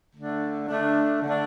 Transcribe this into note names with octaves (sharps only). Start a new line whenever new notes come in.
D3 A3 D4
D3 A3 D4
D3 A3 D4